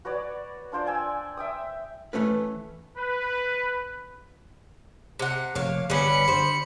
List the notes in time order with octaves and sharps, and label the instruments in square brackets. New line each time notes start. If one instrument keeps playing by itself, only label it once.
[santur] F#4 B4 C#5 D5
D4 F4 C5 D5
G5 G#5 E6
E5 G5 D#6
[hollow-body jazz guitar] E3 G#3 A3 C#4 B4
[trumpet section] B4
[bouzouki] C3 F#5
[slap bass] F1 [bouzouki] A#3 C#5 F5
[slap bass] G1 [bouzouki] G3 B3 C#4 [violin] B5 C#7
[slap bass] D3 [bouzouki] G3 C5